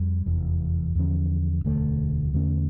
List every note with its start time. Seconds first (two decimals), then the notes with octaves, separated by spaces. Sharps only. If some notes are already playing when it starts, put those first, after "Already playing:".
Already playing: F2 G3
0.26 F1 E2 E3
0.95 E2 D3 F3 C#4
1.64 E1 D2 D3 A3
2.33 E2 D3 A3 C#4